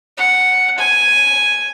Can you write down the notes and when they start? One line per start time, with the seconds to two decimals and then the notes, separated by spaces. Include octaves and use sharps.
0.18 F#5
0.78 G#5